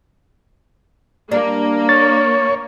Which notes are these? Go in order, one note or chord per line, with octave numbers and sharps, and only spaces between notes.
G3 A#3 D4
C#5 A6